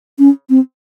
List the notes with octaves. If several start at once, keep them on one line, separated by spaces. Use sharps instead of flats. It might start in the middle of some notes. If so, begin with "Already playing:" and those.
C#4
C4